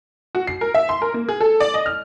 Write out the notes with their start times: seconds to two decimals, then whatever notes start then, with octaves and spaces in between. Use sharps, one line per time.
0.35 F#4
0.47 C7
0.61 A#4
0.74 E5
0.89 C6
1.02 A#4
1.14 A#3
1.29 G#4
1.41 A4
1.60 D5
1.74 D#5
1.86 F6